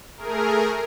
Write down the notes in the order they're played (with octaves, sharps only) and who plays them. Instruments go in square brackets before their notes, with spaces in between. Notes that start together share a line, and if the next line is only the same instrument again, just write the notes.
[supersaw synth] A3 G#4 A#4